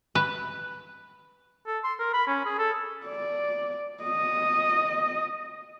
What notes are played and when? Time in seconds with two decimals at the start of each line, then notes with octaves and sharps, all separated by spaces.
0.15 B4
1.67 A4
1.84 C6
2.00 A#4
2.13 B5
2.27 C#4
2.46 G#4
2.59 A4
3.06 D5
4.03 D#5